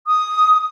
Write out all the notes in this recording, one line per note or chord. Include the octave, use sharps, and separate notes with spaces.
D#6